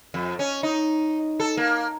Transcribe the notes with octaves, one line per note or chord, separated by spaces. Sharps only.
F2
C#4
D#4
A4
A#3